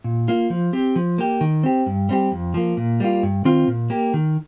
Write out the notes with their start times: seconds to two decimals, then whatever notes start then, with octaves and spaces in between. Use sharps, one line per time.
0.04 A#2
0.28 A#3 F4
0.50 F3
0.73 C4 G4
0.96 F3
1.18 A#3 G4
1.41 D#3
1.63 C4 G4
1.86 G2
2.09 G3 C4 G4
2.32 F2
2.54 F3 A#3
2.77 A#2
3.00 G3 A#3 F4
3.23 G2
3.45 D#3 C4 F4
3.68 A#2
3.90 A#3 G4
4.14 D#3